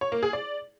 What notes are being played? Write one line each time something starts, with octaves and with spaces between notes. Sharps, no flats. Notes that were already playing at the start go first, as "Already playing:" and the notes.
C#5
A#3
G#4
D5